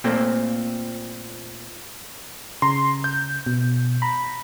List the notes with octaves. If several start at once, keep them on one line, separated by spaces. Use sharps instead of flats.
A#2 A3 A#3 C4
C#3 A#5 C6
G6
B2
A#5 B5